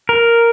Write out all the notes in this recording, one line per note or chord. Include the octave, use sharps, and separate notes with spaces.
A#4